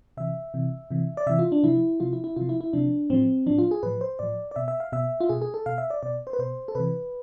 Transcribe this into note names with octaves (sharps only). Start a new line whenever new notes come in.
C3 E3 E5
C3 E3
C3 E3
D5
C3 E3 E5
F4
D4
C3 F3 E4
C3 F3 F4
E4
E4
C3 F3 F4
E4
E4
C3 F3 D4
A2 F3 C4
A2 F3 D4
F4
G#4
A2 F3 B4
C5
A2 F3 D5
D5
B2 E5
E5
F5
B2 E5
F4
B2 G#4
G#4
A4
B2 F5
E5
D5
B2 D5
C5
B4
B2 C5
A4
C3 E3 B4